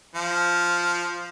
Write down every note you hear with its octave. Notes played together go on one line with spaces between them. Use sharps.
F3